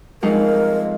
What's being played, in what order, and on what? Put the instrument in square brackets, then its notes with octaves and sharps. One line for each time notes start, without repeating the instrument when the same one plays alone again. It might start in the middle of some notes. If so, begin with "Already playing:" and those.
[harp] F2 G#3 D#4 [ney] A#4